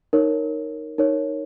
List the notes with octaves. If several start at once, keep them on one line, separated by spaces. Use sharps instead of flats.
D#4 A#4 C#5
D#4 A#4 C#5